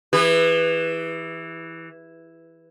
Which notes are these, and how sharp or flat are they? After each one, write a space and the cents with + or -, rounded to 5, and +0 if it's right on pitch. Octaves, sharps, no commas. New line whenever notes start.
E3 +0 G#4 -45 B4 +0